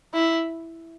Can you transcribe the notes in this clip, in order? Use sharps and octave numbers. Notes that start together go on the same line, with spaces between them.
E4